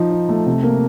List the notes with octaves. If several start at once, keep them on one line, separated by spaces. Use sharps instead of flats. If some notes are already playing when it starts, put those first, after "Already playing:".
Already playing: F3 D#4
D#4
A3
C3
A#3